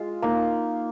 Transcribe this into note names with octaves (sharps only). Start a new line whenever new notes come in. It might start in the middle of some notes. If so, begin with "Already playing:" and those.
Already playing: G#3 F4
A#3 D#4